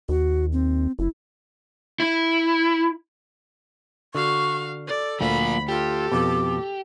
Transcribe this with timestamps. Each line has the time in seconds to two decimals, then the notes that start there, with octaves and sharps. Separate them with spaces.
0.09 D#2 F#4
0.52 C4
0.99 F#1 E4
2.00 E4
4.15 D3 F#4 F5 C#6
4.88 A4 D5
5.21 D2 F3 A#3 F4 B5
5.69 F4 G4 A4
6.12 F2 B2 D6